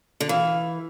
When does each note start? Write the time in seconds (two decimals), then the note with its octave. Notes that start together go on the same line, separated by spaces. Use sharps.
0.20 D3
0.29 E3 F5